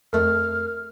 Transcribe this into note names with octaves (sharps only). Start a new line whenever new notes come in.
F2 A3 A#4 F6